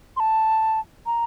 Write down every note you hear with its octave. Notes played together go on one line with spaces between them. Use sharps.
C6
A5
A#5